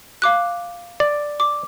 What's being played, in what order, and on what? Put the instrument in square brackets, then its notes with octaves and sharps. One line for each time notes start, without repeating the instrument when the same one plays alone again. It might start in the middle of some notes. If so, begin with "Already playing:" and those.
[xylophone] F5 D6 F#6
[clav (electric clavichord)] D5
[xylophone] D6